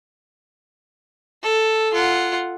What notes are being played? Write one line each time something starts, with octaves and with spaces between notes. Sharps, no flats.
A4
F4 F#5